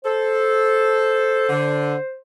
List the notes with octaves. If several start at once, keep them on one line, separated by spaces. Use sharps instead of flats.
A4 C5
D3